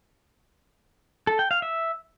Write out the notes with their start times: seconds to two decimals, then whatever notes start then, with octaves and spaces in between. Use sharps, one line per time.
1.27 A4
1.39 G5
1.51 F5
1.62 E5